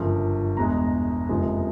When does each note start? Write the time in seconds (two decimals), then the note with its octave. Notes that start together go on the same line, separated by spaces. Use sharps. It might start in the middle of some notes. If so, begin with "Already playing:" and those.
Already playing: G1 F#2 C#3 F3
0.57 E2 B2 G#3 A#5
1.29 F#1 F2 C3 F3 G#3